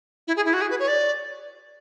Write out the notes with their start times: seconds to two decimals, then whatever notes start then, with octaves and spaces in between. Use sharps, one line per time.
0.28 E4
0.36 G#4
0.45 E4
0.54 F#4
0.61 G#4
0.70 B4
0.79 C#5
0.88 D5